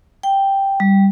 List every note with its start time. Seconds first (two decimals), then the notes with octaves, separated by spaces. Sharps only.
0.23 G5
0.80 G3